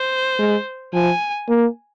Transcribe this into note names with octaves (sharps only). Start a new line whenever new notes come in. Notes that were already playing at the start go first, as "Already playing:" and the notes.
Already playing: C5
G#3
F3 G#5
A#3